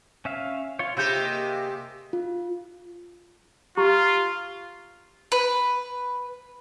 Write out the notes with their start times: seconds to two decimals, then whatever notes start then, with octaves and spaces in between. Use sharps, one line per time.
0.25 C#4 E5 F5
0.79 F4 C#5
0.97 C3 E4 F4 G4 G6
1.16 A#3 G#4 D#5
2.13 F4
3.77 F4 G4 A#5 C#6
5.32 B4